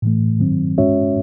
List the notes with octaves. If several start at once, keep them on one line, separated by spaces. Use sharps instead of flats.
A2 E3 A3
D#3 F#3 C4
G#3 C#4 F#4 C#5 E5